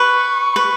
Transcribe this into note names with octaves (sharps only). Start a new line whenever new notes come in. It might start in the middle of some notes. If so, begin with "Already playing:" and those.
Already playing: B4 C#6
B4